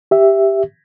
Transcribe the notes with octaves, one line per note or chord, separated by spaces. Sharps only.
G4 E5